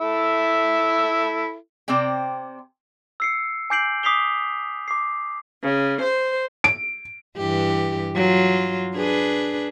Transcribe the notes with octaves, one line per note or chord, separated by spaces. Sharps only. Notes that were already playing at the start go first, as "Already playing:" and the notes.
E4 A4 E5
C3 C4 C5 D5 G5
E6 C7 C#7
G#5 D6 G6 C7 D7 F#7
D6 D#6 B6 C7 F7 G7
D6 C7
C#3
C5
D7
G2 E3 G4
F#3 F4
D4 G#4 B4